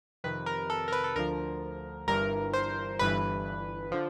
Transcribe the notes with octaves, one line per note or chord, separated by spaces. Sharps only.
F2 C3 D#3 B4
A#4
A4
A#4
B4
A4
D2 D3 F3 A#4
G1 G2 E3 A#4
C5
G1 G2 E3 B4
D3 F3